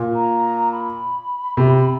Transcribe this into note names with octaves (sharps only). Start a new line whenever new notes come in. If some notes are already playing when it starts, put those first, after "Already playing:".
Already playing: A#2
A#5
B5
C3